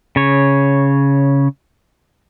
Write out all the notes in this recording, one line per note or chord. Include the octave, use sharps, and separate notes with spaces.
C#3 C#5